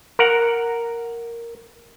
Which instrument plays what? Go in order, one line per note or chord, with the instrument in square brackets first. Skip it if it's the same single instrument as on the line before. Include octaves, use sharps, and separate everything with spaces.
[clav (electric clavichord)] A#4 F#5